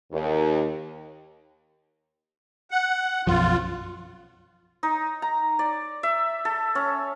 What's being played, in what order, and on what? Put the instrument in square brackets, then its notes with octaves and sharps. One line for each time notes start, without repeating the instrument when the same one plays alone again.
[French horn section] D#2
[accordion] F#5
[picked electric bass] B1 F#2 F3 [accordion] F4
[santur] D#4
A#5
D5
E5
A4
C#4